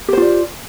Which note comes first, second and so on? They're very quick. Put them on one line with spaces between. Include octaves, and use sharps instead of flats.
G4 C5 F4 D5